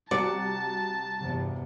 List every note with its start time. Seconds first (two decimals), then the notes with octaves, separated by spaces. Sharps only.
0.11 C2 F#4 D5 A5 C#7
1.19 E2 G2 C3